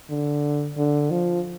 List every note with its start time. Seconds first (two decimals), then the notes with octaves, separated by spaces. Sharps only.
0.10 D3
0.77 D3
1.10 F3